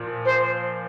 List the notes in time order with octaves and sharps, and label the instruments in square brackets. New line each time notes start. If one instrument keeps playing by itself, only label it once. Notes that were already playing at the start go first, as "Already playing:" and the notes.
Already playing: [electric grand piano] A#2 F3
[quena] C5